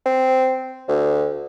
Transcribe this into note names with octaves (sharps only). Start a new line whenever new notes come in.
C4
D2